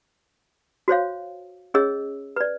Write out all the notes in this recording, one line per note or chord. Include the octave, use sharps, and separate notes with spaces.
F#4 C5 C#5 F5
C#4 G#4 C#5 D#5 E6
B4 D5